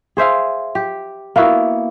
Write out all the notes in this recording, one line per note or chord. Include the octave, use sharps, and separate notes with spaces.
G#4 C5 E5 F5
G4
A#3 B3 E4 F#4